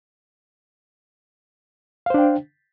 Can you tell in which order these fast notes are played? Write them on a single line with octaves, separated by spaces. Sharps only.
F5 C5 D4 G5